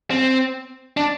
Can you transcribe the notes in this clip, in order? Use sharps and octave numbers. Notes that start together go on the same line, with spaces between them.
C4
D4